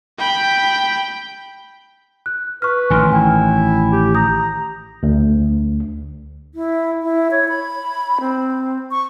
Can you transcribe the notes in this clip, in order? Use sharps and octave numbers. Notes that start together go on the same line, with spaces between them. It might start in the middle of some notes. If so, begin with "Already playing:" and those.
G5 B5
F#6
B4 C#6 F6
A1 D#3 G#5 C6 F6
E4 G5 G#5
G4
A#5 D#6 G6
D2
E4
E4
C#5
B5
C4
C#6